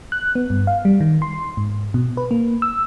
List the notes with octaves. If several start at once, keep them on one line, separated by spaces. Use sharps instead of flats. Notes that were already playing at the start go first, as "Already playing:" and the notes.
F#6
B3
G2
F5
G3
D#3
C6
G#2
B2
B4
A#3
E6